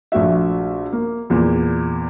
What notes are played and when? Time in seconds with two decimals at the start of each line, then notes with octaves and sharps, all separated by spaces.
0.12 A#1 A3 F#4 E5
0.92 A#3
1.30 E2 A#2